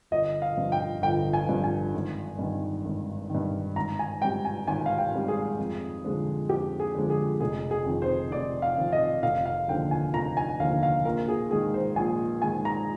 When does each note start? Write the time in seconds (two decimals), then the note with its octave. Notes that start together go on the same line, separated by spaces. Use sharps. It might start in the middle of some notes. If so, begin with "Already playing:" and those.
0.11 G1 D#5
0.42 F5
0.57 G2 F3
0.72 G5
1.02 G1 G5
1.33 G#5
1.48 G2 F3
1.64 G#5
1.94 G#1
2.39 G2 D#3
2.85 G#1
3.30 G2 D#3
3.76 G#1 A#5
3.99 G#5
4.21 G#2 G3 G5
4.45 G#5
4.67 G#1 G#5
4.86 F5
4.98 G5
5.12 G#2 G3
5.28 G#4
5.58 F2
6.04 D3 F3 G#3
6.49 F2 G4
6.80 G#4
6.95 D3 F3 G#3
7.10 G#4
7.40 F1 G#4
7.71 G#4
7.86 F2 D#3
8.02 C5
8.31 F1 D5
8.62 F5
8.78 F2 D#3
8.92 D#5
9.23 F1 F5
9.45 F5
9.68 D#2 D3 F3 G5
9.91 G#5
10.14 F1 A#5
10.37 G#5
10.60 D#2 D3 F3 F5
10.83 F5
11.05 A#1 A#4
11.28 G#4
11.51 G#2 D#3 G#3 G#4
11.74 C5
11.96 A#1 G#5
12.42 G#2 D#3 G#3 G#5
12.65 A#5